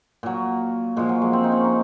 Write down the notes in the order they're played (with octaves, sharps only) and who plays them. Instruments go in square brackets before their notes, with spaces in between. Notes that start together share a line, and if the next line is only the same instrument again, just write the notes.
[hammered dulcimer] A#2 F#3
A#2 F3 G#3
F#3
G#3
C4
D#4
C#4
D#4